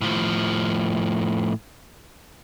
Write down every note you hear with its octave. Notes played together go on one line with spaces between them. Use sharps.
A2 F3